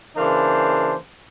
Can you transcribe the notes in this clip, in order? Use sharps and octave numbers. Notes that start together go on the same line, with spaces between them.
C#3 E3 A#3 D4 C5